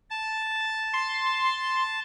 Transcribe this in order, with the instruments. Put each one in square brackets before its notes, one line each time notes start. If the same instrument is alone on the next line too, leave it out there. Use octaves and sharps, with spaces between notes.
[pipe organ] A5
[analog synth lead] C6